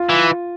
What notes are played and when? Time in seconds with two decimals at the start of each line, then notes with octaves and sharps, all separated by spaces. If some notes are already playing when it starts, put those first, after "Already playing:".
Already playing: F4
0.09 E3